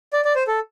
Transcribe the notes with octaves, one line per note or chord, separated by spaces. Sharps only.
D5
D5
C5
A4